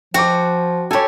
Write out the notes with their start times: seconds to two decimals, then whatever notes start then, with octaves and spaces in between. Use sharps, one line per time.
0.14 F3 F#4 G5 D6
0.91 G4 A4 C#5 G#5